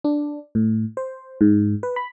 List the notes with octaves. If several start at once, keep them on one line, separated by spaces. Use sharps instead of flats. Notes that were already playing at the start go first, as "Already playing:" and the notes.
D4
A2
C5
G#2
B4
B5